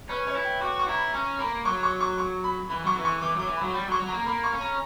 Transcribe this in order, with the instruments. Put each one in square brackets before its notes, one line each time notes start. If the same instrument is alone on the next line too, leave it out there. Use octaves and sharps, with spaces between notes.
[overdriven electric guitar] C#4 [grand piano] B4
[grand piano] C#5
[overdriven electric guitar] E4
[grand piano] G5
[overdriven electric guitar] F#4 [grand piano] D6
[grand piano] C#6
[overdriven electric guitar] E4 [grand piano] A#5
[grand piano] B5
[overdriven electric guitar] C#4 [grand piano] A#5
[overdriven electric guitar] A#3 [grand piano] B5
[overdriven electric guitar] F#3 [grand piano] C#6
[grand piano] C#6
C#6
C#6
B5
[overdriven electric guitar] E3 [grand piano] B5
[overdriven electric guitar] F#3 [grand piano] C#6
[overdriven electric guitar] E3
[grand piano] C#6
[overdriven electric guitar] E3 [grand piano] D6
[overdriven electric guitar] F#3 [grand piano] D6
[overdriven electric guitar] E3
[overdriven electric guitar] F#3 [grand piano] B5
[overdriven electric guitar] G3 [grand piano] B5
[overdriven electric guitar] F#3
[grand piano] C#6
[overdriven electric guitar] F#3
[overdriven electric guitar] A#3 [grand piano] A#5
[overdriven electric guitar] A#3 [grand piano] B5
[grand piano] C#6
[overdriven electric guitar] C#4
[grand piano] A#5